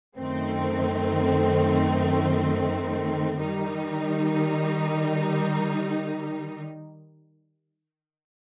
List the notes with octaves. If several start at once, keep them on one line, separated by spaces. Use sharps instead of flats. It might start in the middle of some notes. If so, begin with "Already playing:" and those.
F#2 D#3 A3 C4
D#3 G3 D#4